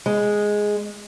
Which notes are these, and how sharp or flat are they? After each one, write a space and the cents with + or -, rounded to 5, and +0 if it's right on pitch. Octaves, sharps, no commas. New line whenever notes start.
G#3 +0